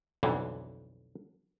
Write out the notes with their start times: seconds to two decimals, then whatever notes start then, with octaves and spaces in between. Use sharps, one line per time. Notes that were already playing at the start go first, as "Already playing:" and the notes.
0.23 B1 F2 D3 E3